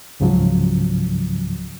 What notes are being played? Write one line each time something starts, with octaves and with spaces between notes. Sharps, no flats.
C#2 G#2 C#3 F3 F#3